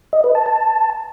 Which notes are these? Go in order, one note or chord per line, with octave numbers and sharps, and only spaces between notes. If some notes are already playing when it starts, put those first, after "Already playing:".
D#5
B4
A5
A5